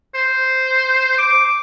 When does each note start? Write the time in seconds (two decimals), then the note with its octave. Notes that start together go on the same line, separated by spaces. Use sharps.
0.15 C5
1.18 D6